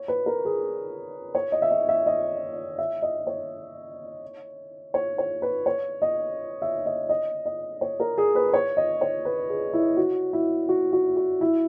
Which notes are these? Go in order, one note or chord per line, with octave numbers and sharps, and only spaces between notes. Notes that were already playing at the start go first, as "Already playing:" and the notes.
Already playing: C#5
B4
A#4
G#4
C#5
D#5
E5
D#5
E5
D#5
E5
D#5
C#5
C#5
C#5
B4
C#5
D#5
E5
D#5
D#5
D#5
C#5
A#4
G#4
B4
C#5
D#5
C#5
B4
G#4
E4
F#4
E4
F#4
F#4
F#4
E4